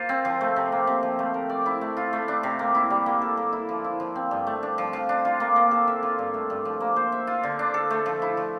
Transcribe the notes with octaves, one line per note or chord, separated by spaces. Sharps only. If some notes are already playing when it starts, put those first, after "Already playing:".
Already playing: A#3 F4 C5
C4
F3
A3
C3
A#3
C3
F3
A3
A#4
D5
E4
A3
F4
A3
D4
C3
A#3
E4
G3
A#3
A4
A#3
E4
F3
E4
F3
C4
G2
A3
D4
F3
F3
D4
F4
A#3
A#3
A4
E5
F4
G2
A3
G2
F3
A#3
C5
E5
F4
D3
D4
A4
A3
F3
E4
F3